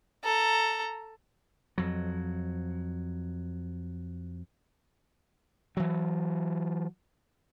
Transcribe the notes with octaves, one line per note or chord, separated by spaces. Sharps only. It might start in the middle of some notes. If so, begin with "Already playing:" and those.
A4 A#5
F2 F#3
E3 F#3